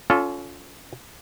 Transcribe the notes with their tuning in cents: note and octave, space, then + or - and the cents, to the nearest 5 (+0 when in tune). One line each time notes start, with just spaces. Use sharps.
C#4 +25 F4 +10 A4 +0